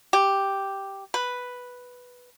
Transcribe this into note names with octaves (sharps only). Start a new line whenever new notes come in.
G4
B4